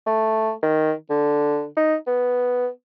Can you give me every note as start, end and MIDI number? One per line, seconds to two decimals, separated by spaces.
0.07 0.51 57
0.63 0.92 51
1.10 1.65 50
1.77 1.95 63
2.07 2.68 59